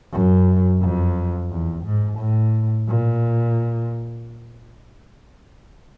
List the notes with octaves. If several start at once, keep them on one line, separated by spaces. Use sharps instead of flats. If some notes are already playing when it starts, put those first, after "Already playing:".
F#2
F2
E2
G#2
A2
A#2